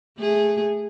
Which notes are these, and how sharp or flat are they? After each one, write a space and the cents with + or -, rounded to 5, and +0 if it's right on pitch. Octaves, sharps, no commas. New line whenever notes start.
A3 -20 G#4 -15